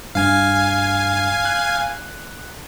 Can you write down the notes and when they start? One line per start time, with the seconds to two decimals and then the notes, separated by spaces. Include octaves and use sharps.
0.15 G2 F5 G#5 G#6
1.45 F#6